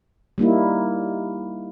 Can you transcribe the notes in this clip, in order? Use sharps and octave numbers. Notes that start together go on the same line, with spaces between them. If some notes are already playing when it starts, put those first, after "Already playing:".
G3 A#3 D#4 E4